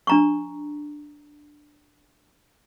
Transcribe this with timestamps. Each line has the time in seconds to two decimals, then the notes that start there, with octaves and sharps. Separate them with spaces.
0.07 D4 A#5 C#6